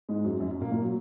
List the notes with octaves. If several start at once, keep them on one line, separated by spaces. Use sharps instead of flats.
G#2 G#3
F#2 F#3
F#2 F#3
F#2 F#3
A#2 A#3
A#2 A#3
F#3